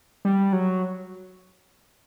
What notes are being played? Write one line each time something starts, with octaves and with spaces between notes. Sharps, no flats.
G3
F#3